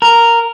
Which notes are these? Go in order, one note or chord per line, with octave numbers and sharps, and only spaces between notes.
A#4